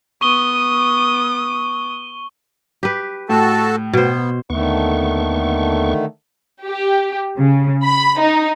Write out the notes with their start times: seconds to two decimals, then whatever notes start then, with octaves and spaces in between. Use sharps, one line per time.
0.21 B3 C#6 D#6 D#7 G7
2.83 G4 B4
3.29 A2 F#4 A4 A5
3.93 B2 B3 C5
4.50 D#2 D3 D#3 A3 B3 C#6
6.67 G4
7.37 C#3
7.83 B5
8.20 D#4